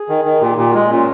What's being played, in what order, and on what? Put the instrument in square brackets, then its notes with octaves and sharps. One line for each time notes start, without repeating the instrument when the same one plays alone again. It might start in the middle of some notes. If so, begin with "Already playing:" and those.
Already playing: [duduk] G#4
[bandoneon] D#3
D#3
[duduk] G#4
[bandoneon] A#2 [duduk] G4
[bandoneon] A#2 [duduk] G4
[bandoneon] G#3 [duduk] F4
[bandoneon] A#2 [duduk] C#4